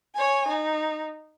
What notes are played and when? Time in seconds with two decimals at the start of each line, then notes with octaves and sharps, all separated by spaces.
0.15 C#5 G#5
0.48 D#4